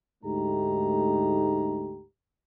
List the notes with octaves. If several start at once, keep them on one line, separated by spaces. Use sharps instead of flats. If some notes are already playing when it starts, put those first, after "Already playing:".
D2 G#2 A3 D#4 G4 A#5